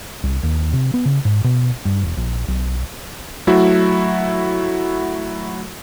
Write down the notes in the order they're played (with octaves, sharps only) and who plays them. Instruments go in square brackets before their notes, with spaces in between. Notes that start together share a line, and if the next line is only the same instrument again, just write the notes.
[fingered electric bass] C2
D#2
C3
B3
C#3
G#2
B2
G2
E1
A#1
B1
[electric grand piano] F#3 A3 E4 F#4 E5